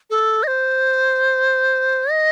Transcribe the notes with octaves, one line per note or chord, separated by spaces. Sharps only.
A4
D#5
C5
D#5